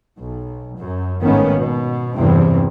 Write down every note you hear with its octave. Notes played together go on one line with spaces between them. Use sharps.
B1
F#2
G#1 A2 D#3 A#3 B3 C#4
B2
F#1 E2 G2 C3 E3 C4